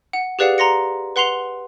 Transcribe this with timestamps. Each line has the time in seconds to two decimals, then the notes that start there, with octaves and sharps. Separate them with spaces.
0.13 F#5
0.39 G4 G#4 B4 D5 F5 F#5
0.58 A#5 C6 A#6 C#7
1.16 B4 F#5 C6 C7 F7 G7